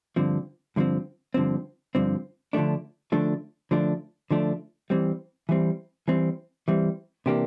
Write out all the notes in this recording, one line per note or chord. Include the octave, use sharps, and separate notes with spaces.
G2 D3 F3 C4
G2 D3 F3 C4
G2 D3 F3 C4
G2 D3 F3 C4
D3 F3 A3 D4
D3 F3 A3 D4
D3 F3 A3 D4
D3 F3 A3 D4
E3 G3 C4
E3 G3 C4
E3 G3 C4
E3 G3 C4
C3 E3 A#3 D4 G4